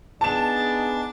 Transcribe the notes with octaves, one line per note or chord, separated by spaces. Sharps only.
B3 D4 D#4 G#4 A5 A6 E7